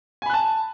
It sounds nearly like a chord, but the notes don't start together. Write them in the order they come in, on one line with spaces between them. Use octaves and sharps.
G#5 B5 F#6 A5